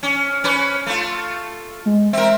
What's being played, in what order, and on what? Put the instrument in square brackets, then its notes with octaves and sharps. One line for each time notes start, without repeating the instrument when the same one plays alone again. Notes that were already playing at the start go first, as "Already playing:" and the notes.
[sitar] C#4
C#4 B4
A3 F4
[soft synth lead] G#3
[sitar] C4 A#4 [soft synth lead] E5